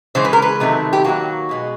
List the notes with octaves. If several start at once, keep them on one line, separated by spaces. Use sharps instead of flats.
C#3 E3 G#3 C5
B4
A#4
B4
C3 D#3 F#3 A3
G4
D#3 F#3 A#3 F#4
B2 G#3 B3